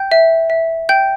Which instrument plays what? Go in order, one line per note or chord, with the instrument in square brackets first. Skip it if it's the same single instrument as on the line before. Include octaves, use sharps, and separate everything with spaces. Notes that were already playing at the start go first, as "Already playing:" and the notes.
Already playing: [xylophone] G5 G6
E5
E5
G5 G6